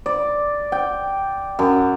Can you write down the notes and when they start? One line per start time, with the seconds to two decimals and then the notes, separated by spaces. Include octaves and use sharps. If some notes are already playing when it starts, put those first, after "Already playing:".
0.06 D5
0.72 G5
1.59 F#2